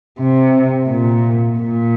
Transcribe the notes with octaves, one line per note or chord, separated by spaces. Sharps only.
C3
A#2
A#2